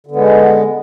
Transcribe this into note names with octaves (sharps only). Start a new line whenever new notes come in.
D3 G#3 B3